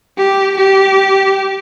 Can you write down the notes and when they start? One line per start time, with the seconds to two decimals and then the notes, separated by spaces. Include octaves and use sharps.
0.18 G4
0.57 G4